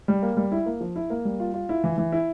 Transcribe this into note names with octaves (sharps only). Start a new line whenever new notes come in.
G3
A#3
G3
E4
A#3
F3
E4
A#3
G3
F4
F4
E4
E3
E3
E4